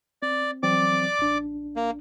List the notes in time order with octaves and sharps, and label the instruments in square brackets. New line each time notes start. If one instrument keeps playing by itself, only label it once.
[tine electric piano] C4 [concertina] D5
[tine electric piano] E3 F#3 C4 [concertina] D5 D6
[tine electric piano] A1 D4
[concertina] A#3